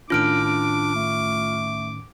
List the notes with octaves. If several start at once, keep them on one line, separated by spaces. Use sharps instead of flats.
A2 D#3 C#4 D4 F4 D6 F6 D7
D4
A3